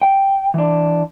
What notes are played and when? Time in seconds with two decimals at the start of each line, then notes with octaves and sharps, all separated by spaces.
0.02 G5
0.54 E3 D4